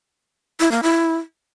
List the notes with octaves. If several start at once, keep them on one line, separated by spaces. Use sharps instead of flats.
E4
A#3
E4